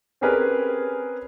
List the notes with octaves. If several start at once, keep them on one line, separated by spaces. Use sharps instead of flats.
C4 C#4 G4 G#4 A#4 B4